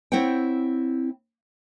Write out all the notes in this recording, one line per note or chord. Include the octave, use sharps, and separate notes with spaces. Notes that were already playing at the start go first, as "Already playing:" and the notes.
C4 E4 C5 C#5 F#5 G5